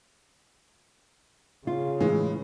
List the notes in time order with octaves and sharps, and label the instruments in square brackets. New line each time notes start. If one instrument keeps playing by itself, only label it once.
[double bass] C#3 [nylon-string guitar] F4
[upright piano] A2 E3 [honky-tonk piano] G#3